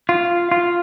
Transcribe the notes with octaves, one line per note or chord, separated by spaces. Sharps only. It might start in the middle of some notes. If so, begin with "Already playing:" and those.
F4
F4